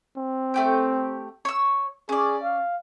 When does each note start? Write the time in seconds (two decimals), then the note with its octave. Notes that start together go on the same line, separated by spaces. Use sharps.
0.17 C4
0.54 A3 G4 G5
1.45 C#5 E6
2.09 C#4 G#4 D5
2.43 F5